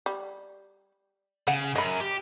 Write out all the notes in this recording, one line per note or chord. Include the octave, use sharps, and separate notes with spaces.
G3
C#3 F#5
F#2 D#5 B5
G4